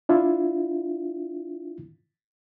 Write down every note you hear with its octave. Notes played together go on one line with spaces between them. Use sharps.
D4 E4 F4